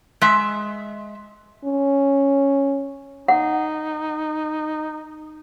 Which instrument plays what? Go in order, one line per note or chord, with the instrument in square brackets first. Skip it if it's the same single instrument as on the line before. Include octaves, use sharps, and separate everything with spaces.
[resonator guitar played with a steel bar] G#3 E5
[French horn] C#4
[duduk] D#4 [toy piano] F#5